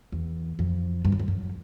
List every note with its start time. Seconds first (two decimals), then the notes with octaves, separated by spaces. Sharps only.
0.12 E2
0.59 F2
1.05 G2
1.12 F#2
1.19 F2
1.28 F#2